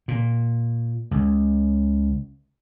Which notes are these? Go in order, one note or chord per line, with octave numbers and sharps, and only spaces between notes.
A#2
C#2